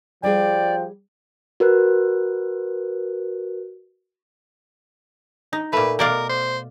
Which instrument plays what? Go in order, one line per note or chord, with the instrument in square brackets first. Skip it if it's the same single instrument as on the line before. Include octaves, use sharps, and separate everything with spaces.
[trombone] F3 [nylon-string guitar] G3 G4 G#4 [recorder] D5 [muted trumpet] G5
[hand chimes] F#4 A#4 B4 F#6
[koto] D#4
[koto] A#2 A3 [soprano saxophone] B4
[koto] B2 D5 F5 [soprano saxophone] A#4
[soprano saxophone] C5